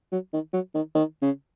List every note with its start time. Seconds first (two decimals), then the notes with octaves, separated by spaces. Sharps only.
0.12 F#3
0.33 D#3
0.53 F#3
0.75 D#3
0.95 D#3
1.22 C#3